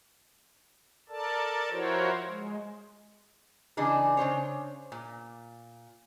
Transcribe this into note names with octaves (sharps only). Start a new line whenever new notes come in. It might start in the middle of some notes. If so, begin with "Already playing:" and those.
A4 A#4 D5 A5
F3 E4 F#4 A#4 C5 C#5
G#3
C#3 E3 D4 D#4 G#4
C#3 D4 C5 C#5
A#2